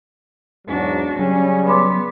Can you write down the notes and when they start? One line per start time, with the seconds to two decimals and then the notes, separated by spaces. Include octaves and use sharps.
0.68 E2 G#2 F#3 D4 F#4
1.19 C#3 F#3 G3 C#4
1.67 B3 B5 C6 D6